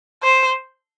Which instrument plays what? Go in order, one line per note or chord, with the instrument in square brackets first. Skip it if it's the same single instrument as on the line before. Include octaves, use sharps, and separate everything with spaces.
[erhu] C5